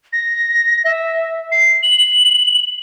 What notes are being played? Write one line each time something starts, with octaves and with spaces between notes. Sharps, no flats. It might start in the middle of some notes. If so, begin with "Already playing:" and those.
A#6
E5
C7
F#7